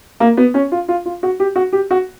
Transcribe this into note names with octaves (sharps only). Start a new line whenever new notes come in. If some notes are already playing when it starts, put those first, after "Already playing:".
A#3
B3
C#4
F4
F4
F4
F#4
G4
F#4
G4
F#4